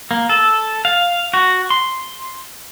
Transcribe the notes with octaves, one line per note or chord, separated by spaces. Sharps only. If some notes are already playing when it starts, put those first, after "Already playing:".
A#3
A4
F5
F#4
C6